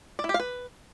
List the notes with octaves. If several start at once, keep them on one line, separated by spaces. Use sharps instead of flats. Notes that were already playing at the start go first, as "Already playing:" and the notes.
D5
E4
G4
F5
B4